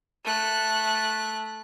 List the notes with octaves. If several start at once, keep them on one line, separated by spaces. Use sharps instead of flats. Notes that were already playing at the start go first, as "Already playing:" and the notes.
A3 F#6